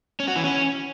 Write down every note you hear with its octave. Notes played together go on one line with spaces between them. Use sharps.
C#4
F#4
E3
C#4